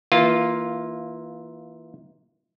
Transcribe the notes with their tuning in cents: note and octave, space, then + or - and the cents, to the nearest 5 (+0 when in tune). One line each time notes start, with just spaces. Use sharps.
E3 -20 A#3 +5 F4 +0